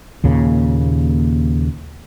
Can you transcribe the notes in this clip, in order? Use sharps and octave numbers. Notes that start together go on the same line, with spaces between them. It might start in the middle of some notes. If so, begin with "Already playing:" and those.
D#2 A#2 C#3